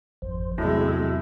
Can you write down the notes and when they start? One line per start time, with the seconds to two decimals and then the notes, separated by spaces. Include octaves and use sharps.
0.22 G#1 F2 C5
0.58 E2 A2 C3 F#3 G#3 E5